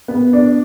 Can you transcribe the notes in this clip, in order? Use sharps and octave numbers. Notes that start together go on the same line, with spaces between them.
B3
D4